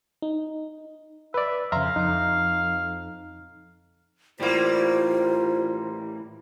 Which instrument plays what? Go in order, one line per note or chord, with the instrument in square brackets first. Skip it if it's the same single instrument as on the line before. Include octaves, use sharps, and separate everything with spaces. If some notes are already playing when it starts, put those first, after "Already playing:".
[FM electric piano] D#4
[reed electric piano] B4 D5 [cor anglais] E5
[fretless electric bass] F2 C#3 [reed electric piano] E5 A#5 C6 [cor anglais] F5
[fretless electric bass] F2 [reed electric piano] D#4 A#5
[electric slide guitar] A2 E3 [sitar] G3 A#3 [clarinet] F4 [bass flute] C5